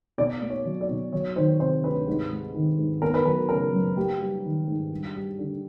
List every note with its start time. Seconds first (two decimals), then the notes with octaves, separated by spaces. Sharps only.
0.18 B2 D5
0.42 A#3
0.50 C#5
0.65 F#3
0.81 D5
0.89 B2
1.13 F#3 C#5
1.36 D#3 C5
1.59 C3 C5
1.84 D2 B4
2.07 G#2
2.31 G#3
2.54 D#3
2.78 G#2
3.02 B3 A#4
3.14 B4
3.25 F#3 A#4
3.49 C#3 A#4
3.73 F#2
3.97 A#3 G4
4.21 G3
4.44 D#3
4.68 G#2
4.91 G2
5.15 G3
5.38 D3